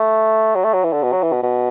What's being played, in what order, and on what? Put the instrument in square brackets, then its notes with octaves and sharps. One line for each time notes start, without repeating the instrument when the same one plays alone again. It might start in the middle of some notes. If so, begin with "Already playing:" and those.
Already playing: [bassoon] A3
F#3
A3
F#3
E3
D3
B2
F#3
E3
B2
B2